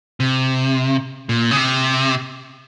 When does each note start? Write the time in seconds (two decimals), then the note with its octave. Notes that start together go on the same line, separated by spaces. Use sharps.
0.20 C3
1.29 A#2
1.51 C#3
1.57 C3